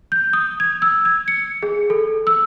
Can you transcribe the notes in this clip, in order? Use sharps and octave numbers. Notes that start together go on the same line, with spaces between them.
G6
D#6
G#6
E6
G#6
C#7
G#4
A4
E6